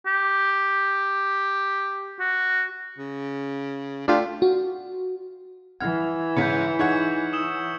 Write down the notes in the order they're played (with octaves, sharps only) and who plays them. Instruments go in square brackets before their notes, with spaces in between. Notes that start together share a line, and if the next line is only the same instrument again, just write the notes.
[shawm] G4
F#4
[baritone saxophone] C#3
[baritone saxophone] A3 [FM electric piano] D4 F4 G4
[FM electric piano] F#4
[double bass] E3 [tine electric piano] F#5 F6 [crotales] G#6
[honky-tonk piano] G#2 C#3 [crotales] G6 B6 C#7
[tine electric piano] D#4 G#6 [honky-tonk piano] G#4 C#5 F#5 [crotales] C#6
[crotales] D#6 E6 E7